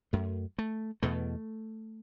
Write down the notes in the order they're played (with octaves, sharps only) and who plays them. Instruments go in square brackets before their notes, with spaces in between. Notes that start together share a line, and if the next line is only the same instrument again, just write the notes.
[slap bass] F#2 A3
A3
E2 B2 A3